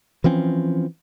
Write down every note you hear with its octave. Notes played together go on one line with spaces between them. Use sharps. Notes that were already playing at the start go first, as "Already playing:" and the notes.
E3 F3 C4 C#4